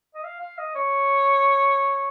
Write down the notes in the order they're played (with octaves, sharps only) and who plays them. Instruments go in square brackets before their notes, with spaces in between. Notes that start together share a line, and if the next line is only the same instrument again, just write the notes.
[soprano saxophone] D#5
F5
F5
D#5
C#5